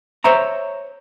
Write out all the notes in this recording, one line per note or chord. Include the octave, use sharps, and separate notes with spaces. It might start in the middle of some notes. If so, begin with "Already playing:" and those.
C5 C#5 E5 A#5